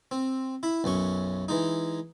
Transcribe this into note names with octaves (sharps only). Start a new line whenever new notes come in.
C4
E4 B5
B1 F#2 C#4 C#6
E3 G#3 D#4